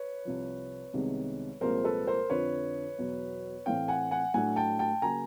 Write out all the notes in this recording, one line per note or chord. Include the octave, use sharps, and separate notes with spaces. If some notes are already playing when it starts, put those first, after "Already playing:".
Already playing: B4 C#5
C2 C3 F3
C2 C3 D#3 G#3 B3
C2 A#2 F3 G#3 C4 A#4 C5
A4 B4
A#4 C5
F2 D3 F3 B4 C#5
E2 B2 F#3 B3
A2 E3 A3 C4 F5 G5
F#5 G#5
F#5 G#5
A2 F#3 A3 D4 F#5 G#5
G5 A5
G5 A5
C#3 F#3 A#3 G#5 A#5